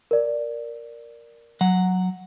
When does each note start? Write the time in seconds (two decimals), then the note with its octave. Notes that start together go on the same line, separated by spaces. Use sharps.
0.11 A#4 D5
1.61 F#3 F#5